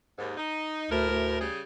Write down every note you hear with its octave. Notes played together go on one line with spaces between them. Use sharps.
D#2 G#2
D#4
D2 A2 A#4
D2
C#3 G3 G#4